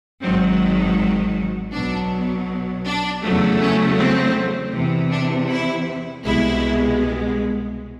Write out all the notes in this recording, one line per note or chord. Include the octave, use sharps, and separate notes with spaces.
G#1 G#2 D#3 F#3 C4
B1 B2 F#3 D4
D4
E2 C#3 F#3 A3
C#4
C4
E2 C3 E3
D4
E4
C2 B2 G#3 E4